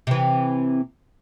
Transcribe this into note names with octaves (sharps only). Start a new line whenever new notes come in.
C3 E3